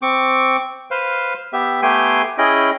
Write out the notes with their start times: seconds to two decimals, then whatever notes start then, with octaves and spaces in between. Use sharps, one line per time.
0.02 C4 C#6 D6
0.91 B4 C5 F5
1.53 B3 G4 E5
1.82 A3 B3 G4 G5 G#5 C6
2.38 C#4 E4 G#4 D#5 G5